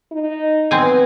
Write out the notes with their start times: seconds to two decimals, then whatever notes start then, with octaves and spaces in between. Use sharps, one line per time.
0.11 D#4
0.71 B2 F#3 C4 G#5